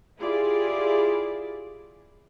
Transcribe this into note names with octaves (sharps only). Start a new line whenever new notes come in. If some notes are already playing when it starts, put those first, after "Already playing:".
E4 F4 G4 G#4 D5